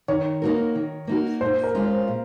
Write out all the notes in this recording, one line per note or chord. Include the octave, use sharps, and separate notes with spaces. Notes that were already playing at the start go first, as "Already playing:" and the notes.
D#3 C#5
A#3 D#4 F#4 A#4
D#3
A#3 D#4 F#4 A#4
A#2 C5
A#4
G#3 C#4 F4
C5
A#2